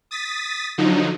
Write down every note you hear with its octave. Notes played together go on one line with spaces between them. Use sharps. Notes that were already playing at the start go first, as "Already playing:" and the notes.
D#6 A6 B6
D3 F3 F#3 D#4